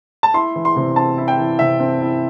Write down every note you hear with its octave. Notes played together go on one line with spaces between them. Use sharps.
A5
E4 C6
E3
C6
C3
C4 A5
E4
G5
E3
C3 E5
C4
E4